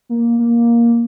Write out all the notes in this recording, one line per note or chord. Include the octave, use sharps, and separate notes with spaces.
A#3
A#3